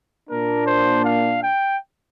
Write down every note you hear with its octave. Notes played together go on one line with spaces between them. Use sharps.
A#2 A#3 D4 A#4
C5
F5
G5